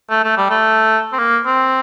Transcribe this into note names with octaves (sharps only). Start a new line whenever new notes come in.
A3
A3
G3
A3
C4
A#3
C4